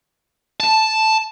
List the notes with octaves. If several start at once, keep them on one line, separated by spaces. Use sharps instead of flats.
A5